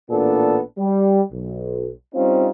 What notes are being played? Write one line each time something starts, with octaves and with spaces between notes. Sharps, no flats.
A1 A#2 B3 D4 A4
G3
B1
G3 C4 C#4 D#4 F4